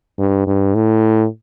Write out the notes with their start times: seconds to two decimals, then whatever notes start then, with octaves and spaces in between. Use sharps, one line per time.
0.18 G2
0.47 G2
0.75 A2